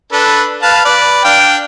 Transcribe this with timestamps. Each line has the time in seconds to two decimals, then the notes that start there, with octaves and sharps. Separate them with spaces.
0.12 D4 A4 B4
0.63 B4 F5 A5
0.85 B4 D5
1.24 D4 F5 G5